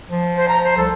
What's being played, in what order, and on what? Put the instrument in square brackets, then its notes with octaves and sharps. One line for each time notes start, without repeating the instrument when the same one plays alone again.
[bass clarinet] F3
[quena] C5
A#5
C5
[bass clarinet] C2 [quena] A4